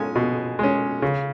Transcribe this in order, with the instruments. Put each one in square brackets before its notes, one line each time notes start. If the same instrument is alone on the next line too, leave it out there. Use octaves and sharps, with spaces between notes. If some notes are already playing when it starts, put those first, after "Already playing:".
Already playing: [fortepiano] G#3 C#4 G#5
B2
G#3 C#4
C#3